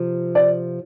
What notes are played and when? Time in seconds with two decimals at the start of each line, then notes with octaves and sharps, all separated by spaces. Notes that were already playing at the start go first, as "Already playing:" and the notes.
Already playing: C3 F3
0.35 D5